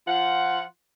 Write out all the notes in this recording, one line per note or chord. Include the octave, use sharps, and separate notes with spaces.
F3 F4 F#5